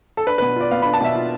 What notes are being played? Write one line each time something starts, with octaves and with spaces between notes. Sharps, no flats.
A4
D4 B4
B2 B4
F4 D5
B3 F5
D4 B5
A5
B2 E5
F4